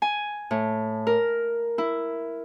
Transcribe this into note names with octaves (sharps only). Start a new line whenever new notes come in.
G#5
A2
A#4
E4